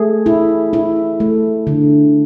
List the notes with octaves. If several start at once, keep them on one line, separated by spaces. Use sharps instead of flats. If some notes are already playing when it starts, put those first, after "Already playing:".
Already playing: A3 G#4
E4
E4
A3
D3